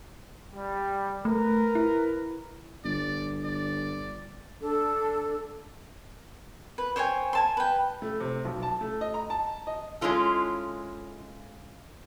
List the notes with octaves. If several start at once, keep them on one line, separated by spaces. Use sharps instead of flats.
G3
A3 A#4 B4
E4
G1 D5
D5
D4 A4
B4
C5 C#5 G5 G#5
G#5 A5 C6
B4 G5
A3
C3
B1
A5
A3
D#5
A#5
A5
D#5
G#3 C#4 E4 F4 A4